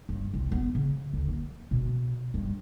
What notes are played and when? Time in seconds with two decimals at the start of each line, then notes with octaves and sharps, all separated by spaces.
0.09 G2
0.34 C2
0.52 B3
0.75 C#3
1.13 D2
1.28 A#3
1.71 B2
2.34 G2